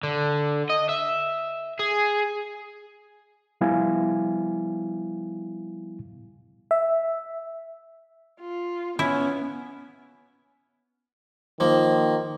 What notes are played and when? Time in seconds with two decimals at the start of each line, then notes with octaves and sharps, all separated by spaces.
0.04 D3
0.69 D#5
0.89 E5
1.79 G#4
3.61 F3 G3 B3 E4 F5 G#5
6.71 E5
8.41 F4
8.99 B3 C#4 E4
11.60 D#3 F3 A#3